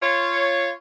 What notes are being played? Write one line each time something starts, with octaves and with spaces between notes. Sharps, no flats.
F4 C#5